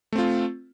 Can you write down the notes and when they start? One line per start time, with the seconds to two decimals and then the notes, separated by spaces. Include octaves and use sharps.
0.13 A3
0.15 C4
0.18 F4